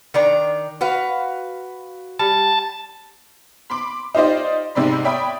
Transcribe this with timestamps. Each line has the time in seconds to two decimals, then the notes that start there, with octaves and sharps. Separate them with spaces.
0.14 D#3 D4 A#5
0.81 F#4 B4 F5
2.19 G3 A5
3.70 B5 C6 D6
4.15 D#4 F4 G4 C5 D5 D#5
4.75 G#2 C3 C4 D5 B5
5.04 C#5 D5 E5 G5 B5 D#6